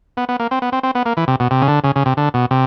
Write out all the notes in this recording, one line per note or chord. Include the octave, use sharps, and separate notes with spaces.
B3
B3
A#3
C4
B3
C4
C4
B3
A#3
E3
C3
B2
C3
C#3
D3
C#3
C#3
C3
D3
B2
C3